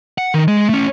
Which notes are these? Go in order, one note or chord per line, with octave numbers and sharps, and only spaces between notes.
F#5
D#3
G#3
A3 C#4